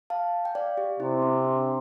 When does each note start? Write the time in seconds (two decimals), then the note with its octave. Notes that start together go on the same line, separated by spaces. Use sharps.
0.10 F5 A5
0.45 G5
0.55 D5 F5
0.77 G4
1.00 C3 E4
1.22 C4
1.45 D4